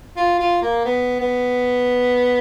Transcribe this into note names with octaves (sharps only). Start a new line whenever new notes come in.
F4
F4
A#3
B3
B3